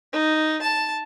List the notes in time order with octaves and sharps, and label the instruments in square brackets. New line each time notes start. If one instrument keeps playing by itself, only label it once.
[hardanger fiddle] D#4
A5